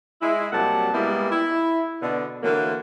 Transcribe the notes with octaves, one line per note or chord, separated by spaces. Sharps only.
G#3 E4
C3 F#3 G3 A#3 F#5 A5
G3 G#3 A#3 B3 E4 G4
E4
B2 D3
D3 E3 F#3 A#3